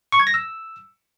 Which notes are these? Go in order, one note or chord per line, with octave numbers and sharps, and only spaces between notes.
C#6
G#6
A#6
E6